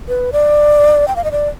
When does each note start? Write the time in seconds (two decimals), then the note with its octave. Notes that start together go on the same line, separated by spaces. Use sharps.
0.08 B4
0.33 D5
1.08 G5
1.16 F5
1.24 D#5
1.32 D5